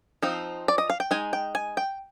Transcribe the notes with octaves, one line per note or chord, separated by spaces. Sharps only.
F3 C4 D#4
D5
D#5
F5
G5
G#3 D#4 G#5
G5
G#5
G5